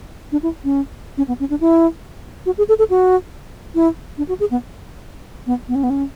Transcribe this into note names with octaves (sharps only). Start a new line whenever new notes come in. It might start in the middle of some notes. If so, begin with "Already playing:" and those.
D4
E4
C#4
C#4
B3
C#4
D4
E4
F#4
G#4
A4
A4
F#4
E4
D4
F#4
G#4
B3
B3
B3
C#4
B3
C#4